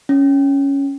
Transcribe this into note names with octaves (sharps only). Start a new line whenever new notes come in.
C#4